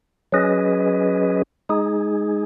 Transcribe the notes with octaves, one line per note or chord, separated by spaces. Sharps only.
F#3 C#4 G#4 B4 D#5
G#3 D#4 G#4